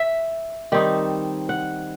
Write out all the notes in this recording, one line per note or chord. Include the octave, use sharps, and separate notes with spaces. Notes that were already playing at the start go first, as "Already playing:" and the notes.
Already playing: E5
D#3 G3 C4 D#4
F#5